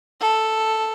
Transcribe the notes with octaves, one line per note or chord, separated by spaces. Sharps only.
A4